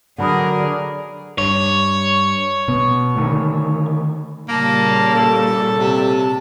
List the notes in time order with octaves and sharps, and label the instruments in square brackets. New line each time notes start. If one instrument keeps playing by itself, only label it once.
[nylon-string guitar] D3 F#3 [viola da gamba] G#4 A#4 [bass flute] D5 [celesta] F#5 B5 D#6
[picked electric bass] G2 [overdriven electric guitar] C#5
[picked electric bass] B2 B3
D3 D#3 A3
[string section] A#2 C#3 G3 [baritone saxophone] A#3 [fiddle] A5
[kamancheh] A4
[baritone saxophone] C3